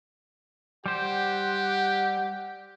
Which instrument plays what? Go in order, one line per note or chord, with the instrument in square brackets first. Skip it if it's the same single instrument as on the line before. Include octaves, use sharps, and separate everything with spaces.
[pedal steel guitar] G3 C5 [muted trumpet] G4 [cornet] F#5